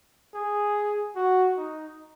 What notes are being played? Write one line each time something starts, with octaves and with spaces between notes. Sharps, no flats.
G#4
F#4
D#4